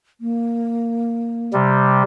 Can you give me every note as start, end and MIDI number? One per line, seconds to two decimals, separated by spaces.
0.21 1.52 58
1.53 2.03 48
1.53 2.03 55